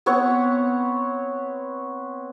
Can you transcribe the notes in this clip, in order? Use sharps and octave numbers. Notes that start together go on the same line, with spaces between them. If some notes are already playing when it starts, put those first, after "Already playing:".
B3 C4 C#5 F#5